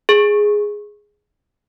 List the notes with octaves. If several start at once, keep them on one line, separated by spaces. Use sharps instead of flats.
G#4